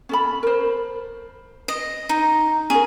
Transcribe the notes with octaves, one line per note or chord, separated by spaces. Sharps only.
C#4 A4 B5
A#4 C5
D#5
D#4
C#4 G#4 A#4